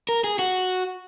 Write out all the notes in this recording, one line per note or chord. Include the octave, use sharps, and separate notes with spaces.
A#4
G#4
F#4